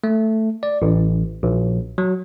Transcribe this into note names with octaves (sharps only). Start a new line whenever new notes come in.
A3
D5
A1
A#1
F#3